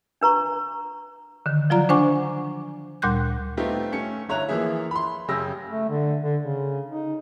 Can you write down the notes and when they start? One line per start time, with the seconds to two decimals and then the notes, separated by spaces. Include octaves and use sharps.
0.21 D4 B4 A#5 C#6
1.46 D3 D#3
1.70 F3 F#3 F4 D5 A#5
1.89 D4 C5 F#5 G#5 C#6 D6
3.02 D2 A#2 G3 C6 F#6 G6
3.57 A3 B3 C4 D#4 F4 G4
3.92 A3 C#4 C#7
4.29 G1 E4 C#5 A#5 F#6 F7
4.49 E3 F3 A#3 G#4 E5
4.91 B5 C6
5.28 F#2 C#3 G4 E6 A#6
5.69 A3
5.89 D3
6.22 D3
6.43 C#3
6.88 D#4